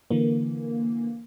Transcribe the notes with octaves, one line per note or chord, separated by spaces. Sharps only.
D3 E3 A#3